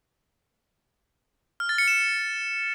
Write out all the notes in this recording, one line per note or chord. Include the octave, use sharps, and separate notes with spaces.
F6
A6
C#7
E7